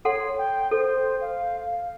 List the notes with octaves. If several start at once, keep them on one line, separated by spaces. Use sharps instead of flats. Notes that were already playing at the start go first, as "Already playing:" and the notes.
A4 C#5 F#5 C6
G5
A4 C5
F5
F5